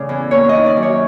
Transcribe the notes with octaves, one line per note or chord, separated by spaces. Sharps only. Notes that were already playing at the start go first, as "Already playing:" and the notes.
Already playing: A2 C#3 E3 D5
E2
A#3 C#5
D#5
D#3
D5
F#2
C#5